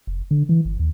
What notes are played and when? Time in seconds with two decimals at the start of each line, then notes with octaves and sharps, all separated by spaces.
0.07 F1
0.31 D3
0.49 E3
0.65 G1
0.79 D#2